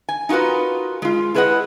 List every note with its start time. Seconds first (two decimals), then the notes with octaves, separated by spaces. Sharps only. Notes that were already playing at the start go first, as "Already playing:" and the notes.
0.09 G#5
0.29 D#4 F4 F#4 A#4 B4
1.02 G#3 F4
1.34 E4 G#4 B4 C#5 D#5 F#5